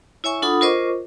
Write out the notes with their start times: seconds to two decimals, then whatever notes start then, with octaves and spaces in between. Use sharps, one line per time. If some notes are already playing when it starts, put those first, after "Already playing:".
0.24 E4 C#5 E5 G#5 C#6
0.42 D4 F4 A4 F#5 B5 D#6
0.61 F4 A#4 C5 D#5 C#6 D6